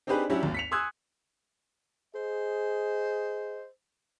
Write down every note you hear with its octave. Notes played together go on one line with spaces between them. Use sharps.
C4 D4 D#4 G4 G#4 B4
F#3 C#4 D4 E4 F#4 G4
G#1 D#2
B6 C#7 F7
G#5 C6 D#6 E6 F#6 G#6
G#4 C5 D#5